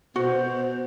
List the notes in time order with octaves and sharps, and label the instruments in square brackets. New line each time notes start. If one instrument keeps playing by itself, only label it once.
[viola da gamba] B2 [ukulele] F#4 [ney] C5